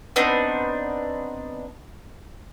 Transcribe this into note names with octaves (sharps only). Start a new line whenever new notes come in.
B3 C4 D4 D#4